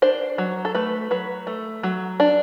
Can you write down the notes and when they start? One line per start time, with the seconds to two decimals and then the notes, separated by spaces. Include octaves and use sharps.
0.02 D4 C5
0.38 F#3
0.65 A4
0.75 A3 B4
1.11 F#3 B4
1.47 A3
1.83 F#3
2.20 D4